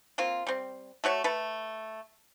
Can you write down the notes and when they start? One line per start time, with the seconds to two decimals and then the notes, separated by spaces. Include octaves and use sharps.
0.18 A#3 C4 F4
0.47 G3 C4
1.04 A3 F#4 C#5 E5
1.24 A3 A4 B4